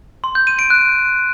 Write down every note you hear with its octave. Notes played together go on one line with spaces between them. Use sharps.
C6
G6
D#7
D7
F#6